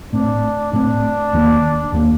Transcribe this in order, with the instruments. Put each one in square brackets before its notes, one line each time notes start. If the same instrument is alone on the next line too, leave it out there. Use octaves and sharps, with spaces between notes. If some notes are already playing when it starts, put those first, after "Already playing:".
[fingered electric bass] A2 A3 C4 [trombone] D4
[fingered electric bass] A2 A3 C4 [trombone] D4
[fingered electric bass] D#2 D#3 A#3
D#2 D#3 A#3